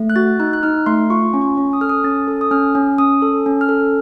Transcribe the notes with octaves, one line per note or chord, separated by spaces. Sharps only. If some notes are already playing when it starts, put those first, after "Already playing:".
Already playing: A3
F#6
F#4 A6
D#4 F#6
F#6
D#4 F6
A3 C6
F4 C#6
C#4
C#6
C#4
D#6
A4 F6
D#6
C#4 A6
A4
D#6
C#4 F6
C#4
C#4 D#6
A4
C#4
F6
A4